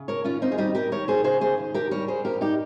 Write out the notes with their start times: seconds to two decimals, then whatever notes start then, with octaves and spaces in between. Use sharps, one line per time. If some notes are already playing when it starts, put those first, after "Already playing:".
Already playing: C#3
0.08 A#4 C#5
0.24 D#2 C#4 F4
0.42 C4 D#4
0.52 G#4
0.58 G3 D#4 G4
0.75 G4 A#4
0.92 D#2 A#4 C#5
1.08 G#4 C5
1.24 C#3 G#4 C5
1.41 G#4 C5
1.58 D#2
1.74 G4 A#4
1.91 G3 A#4 C#5
2.08 G#4 C5
2.25 G2 G4 A#4
2.41 D#4 G4